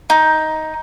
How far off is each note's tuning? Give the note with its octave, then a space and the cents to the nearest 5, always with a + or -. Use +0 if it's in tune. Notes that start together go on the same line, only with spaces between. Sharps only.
D#4 +10